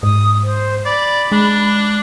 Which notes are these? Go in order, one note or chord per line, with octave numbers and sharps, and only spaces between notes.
G#2 D#6
C5
D5 B5
G#3 D4